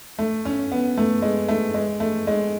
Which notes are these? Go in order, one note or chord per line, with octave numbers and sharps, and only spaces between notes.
A3
C#4
B3
A3
G#3
A3
G#3
A3
G#3